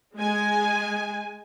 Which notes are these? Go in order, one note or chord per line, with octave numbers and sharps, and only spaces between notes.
G#3 G#5